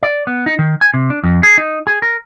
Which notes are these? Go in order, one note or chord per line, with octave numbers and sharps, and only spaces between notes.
D5
B3
D#4
D#3
G#5
C3
D4
F2
G#4
D#4
G#4
A#4